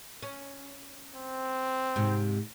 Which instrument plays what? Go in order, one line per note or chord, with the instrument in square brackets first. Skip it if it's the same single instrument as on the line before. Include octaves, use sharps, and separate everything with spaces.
[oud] C#4
[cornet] C4
[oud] G#2 C3